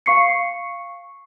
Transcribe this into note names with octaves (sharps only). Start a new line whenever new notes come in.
F5 C#6 C7 C#7